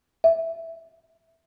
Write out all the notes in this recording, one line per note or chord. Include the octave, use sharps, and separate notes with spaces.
E5